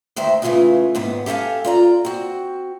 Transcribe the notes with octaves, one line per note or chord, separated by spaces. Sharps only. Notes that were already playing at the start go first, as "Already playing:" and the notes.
D2 D#3 C5 E5
C#3 E3 F3 A3 F4 G#4
D#2 G#2 B3
G4 A4 E5 F5 G#5
F4 D5 A#5
C4 F#4